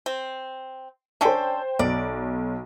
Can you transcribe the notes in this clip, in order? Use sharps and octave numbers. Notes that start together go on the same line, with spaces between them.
C4
C#4 D4 A4 C5 G5
B1 D5 D7